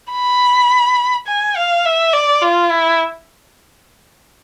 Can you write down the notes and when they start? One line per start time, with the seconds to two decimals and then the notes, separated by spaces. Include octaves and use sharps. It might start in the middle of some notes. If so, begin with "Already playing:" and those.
0.12 B5
1.27 G#5
1.56 F5
1.85 E5
2.14 D5
2.42 F4
2.71 E4